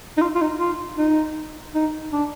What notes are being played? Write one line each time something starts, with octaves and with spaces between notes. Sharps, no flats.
D#4
F4
F4
D#4
F4
D#4
D#4
D4